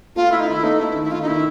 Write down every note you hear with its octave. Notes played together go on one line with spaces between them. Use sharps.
A3 F4
A3 E4
D#4
D#3 E4
A3 D#4
A3 E4
D#3
E4
D#3 F4
D#4
D#3 E4